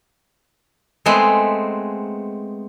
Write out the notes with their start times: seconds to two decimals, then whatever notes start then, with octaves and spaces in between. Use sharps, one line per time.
1.06 G#3 A3 B3 C4 G#4 B4